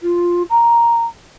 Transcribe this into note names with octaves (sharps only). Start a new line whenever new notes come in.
F4
A#5